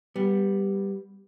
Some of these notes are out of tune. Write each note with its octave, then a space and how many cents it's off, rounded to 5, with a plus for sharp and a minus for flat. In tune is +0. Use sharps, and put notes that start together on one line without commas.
G3 +5 B3 +0